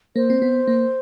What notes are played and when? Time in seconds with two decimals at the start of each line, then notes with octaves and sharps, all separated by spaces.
0.16 A#3 C5
0.30 C4
0.42 B3
0.67 A#3